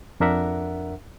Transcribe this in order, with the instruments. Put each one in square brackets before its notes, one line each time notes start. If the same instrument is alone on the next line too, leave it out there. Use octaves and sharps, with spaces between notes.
[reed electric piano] F2 D4 A#4 E5 F#5